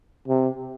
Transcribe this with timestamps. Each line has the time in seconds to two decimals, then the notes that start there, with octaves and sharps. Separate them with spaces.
0.28 C3